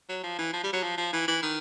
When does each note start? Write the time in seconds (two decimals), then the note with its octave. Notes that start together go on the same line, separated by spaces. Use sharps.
0.09 F#3
0.23 F3
0.39 E3
0.53 F3
0.64 G3
0.73 F#3
0.83 F3
0.97 F3
1.13 E3
1.28 E3
1.43 D#3